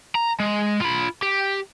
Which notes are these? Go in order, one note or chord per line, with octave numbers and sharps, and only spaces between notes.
A#5
G#3
F4 B5
G4